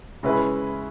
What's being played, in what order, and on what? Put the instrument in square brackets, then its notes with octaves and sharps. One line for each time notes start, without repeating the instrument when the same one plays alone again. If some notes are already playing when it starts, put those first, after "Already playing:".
[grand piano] C#3 G#3 C#4 E4 B4